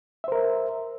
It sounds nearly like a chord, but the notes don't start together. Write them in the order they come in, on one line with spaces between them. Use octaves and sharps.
E5 C5 A#4